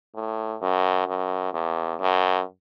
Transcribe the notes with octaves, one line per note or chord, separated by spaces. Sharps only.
A2
F#2
F#2
E2
F#2